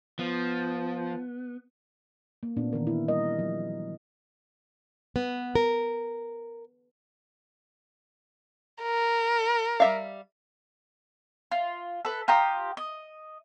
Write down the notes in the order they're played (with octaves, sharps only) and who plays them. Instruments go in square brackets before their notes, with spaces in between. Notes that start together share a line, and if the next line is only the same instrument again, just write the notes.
[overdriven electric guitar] F3 [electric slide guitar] B3
[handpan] A#3
A#2 B3 C4 D4
D#3 E3 A#4
E4
G3 A#4 D#5
F3 F#3
[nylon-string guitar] B3
A#4
[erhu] A#4
[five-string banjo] G3 E5 F5
[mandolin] F4
A4 B4
F4 G4 A#5 D#6
D#5